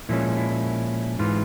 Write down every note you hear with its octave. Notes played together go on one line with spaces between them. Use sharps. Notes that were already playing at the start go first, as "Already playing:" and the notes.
A#2 F3 G#3 C#4 E4
E4
G#2 E3 F4